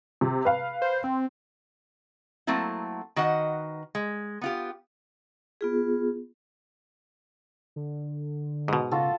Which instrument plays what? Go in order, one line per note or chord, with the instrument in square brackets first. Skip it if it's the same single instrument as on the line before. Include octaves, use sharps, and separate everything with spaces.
[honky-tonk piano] C3
B4 F5
[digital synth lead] C5
C4
[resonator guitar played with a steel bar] F#3 A3 A#3 C4 E4
D#3 F#4 B4 D#5 F#5
G#3
B3 F4 G4
[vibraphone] B3 F4 G#4
[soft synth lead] D3
[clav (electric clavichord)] G#2 B2 [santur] D#6
[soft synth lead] C#3 [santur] F4 F#4 A4